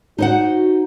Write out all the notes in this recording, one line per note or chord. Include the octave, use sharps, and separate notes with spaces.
D#4 F#4 C5 F#5